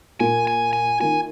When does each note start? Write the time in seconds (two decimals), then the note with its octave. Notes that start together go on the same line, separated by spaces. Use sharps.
0.20 A#2 A#3 F4 G#5
0.47 G#5
0.73 G#5
1.00 D#3 A#3 F4 G#5